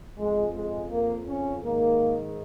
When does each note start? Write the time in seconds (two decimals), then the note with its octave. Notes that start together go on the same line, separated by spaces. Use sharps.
0.18 F2 C#3 G#3
0.54 G#3
0.91 A#3
1.28 C#4
1.63 G#2 D#3 A#3